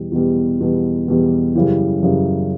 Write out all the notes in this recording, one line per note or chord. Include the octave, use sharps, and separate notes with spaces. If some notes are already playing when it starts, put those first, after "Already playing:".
Already playing: E2 B2 G3
E2 B2 G3
E2 B2 G3
E2 B2 G3
F#2 C#3 E3 G3
F#2 C#3 E3 G3